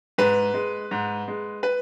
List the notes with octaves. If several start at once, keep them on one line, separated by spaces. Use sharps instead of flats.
G#2 B4
G#3
G#2
G#3
B4